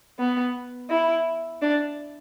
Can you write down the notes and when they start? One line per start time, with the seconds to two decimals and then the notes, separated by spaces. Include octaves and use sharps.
0.19 B3
0.90 E4
1.62 D4